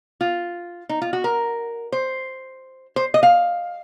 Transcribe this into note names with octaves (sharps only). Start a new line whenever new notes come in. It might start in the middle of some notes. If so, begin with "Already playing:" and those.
F4
D#4
F4
F#4
A#4
C5
C5
D#5
F5